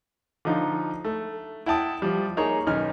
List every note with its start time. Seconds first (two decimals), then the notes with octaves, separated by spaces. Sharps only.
0.45 D3 F3 D#4 F4
1.05 A3
1.66 E4 F#5 G5 A5 D#6
2.02 F3 G3
2.37 A#3 D#4 G#4 A#4 C#5
2.67 B1 D#3 C#4 F6